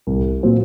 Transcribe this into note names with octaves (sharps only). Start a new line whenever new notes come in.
C2
A#2 F#3 C4